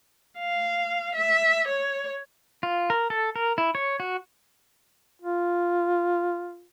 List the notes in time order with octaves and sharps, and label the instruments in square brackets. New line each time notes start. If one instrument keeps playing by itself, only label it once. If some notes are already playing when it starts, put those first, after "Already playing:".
[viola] F5
E5
C#5
[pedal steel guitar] F4
A#4
A4
A#4
E4
C#5
F#4
[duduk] F4